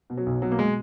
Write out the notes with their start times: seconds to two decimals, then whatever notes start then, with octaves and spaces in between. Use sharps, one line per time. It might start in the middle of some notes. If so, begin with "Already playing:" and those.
0.10 B2
0.17 F#3
0.26 B1
0.42 B2 F#3
0.52 A#3
0.59 G#3